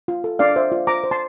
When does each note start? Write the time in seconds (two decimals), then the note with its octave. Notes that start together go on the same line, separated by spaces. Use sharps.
0.08 F4
0.24 A4
0.39 D4 D5 F5
0.56 C5 E5
0.72 F4
0.87 C5 A#5 D6
1.04 C5
1.11 A5 C6